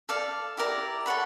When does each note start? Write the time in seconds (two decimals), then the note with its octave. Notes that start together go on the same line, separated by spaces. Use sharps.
0.09 A4 D5 F5
0.57 E4 G4 A#4 D5
1.06 A4 C#5 F#5 B5